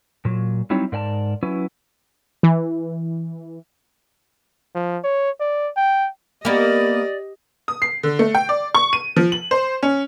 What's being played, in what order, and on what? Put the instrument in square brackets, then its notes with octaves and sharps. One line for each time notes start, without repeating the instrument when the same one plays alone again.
[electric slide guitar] A#2 F#3
F#3 G3 C4 D#4 E4 C#5
G#2 A#4 D5 G#5 A5
F#3 C#4 E4 B4
[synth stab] E3
[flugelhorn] F3
C#5
D5
G5
[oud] A#3 B3 [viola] G4 D#5 [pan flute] D5
[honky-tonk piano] D#6
C7
D3
A3
G5
D5
C#6
D#7
F3
F#7
C5
C#4